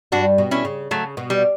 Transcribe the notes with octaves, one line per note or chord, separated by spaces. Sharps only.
G2 G3 D4 F#4
B2
C#4 E4
C#3
C#3 F#3 A3
B2
G3